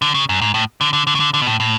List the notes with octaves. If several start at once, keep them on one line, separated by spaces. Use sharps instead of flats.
D3
C#3
F#2
G#2
A2
D3
D3
D3
C#3
D3
D3
B2
A2
A2